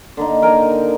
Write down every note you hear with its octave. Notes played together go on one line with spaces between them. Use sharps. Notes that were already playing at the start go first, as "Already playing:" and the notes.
D3 A#3 D#4
A#4 G5 G#5 A#5